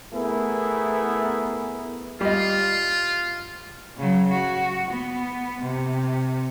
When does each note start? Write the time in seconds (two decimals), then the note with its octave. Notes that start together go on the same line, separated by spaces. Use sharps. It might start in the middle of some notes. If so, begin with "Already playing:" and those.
0.13 A3 B3 E4 G#4 A#4
2.21 G3 F4 D#5
3.98 C#3 F#3
4.32 F#4
4.91 B3
5.62 C3